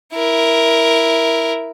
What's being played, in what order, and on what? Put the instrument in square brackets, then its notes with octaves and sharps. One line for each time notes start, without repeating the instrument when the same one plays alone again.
[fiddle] E4 A#4